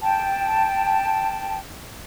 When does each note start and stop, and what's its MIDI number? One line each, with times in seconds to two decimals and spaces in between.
0.02 1.57 79
0.02 1.57 81